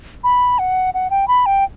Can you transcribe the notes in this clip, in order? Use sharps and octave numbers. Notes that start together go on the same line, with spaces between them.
B5
F#5
F#5
G5
B5
G5